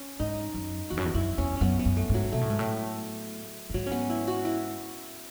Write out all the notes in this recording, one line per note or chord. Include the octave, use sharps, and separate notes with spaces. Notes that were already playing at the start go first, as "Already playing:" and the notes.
Already playing: C#4
G#2 D#4
F#2
E2 F#4
F#2
E2
F#2 E4
E2 C#4
F#2 B3 C#4
B3
F#2
A3
G#2 F#3
B2 A3
A2
G#2
A2
F#2
G#2 F#3
C#4
B3
E4
F#4
E4